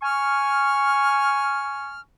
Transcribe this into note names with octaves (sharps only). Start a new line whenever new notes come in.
G#5 C#6 F6